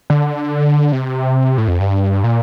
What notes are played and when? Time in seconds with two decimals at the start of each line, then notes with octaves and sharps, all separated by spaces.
0.10 D3
0.92 C3
1.58 A2
1.68 F2
1.80 G2
2.24 A#2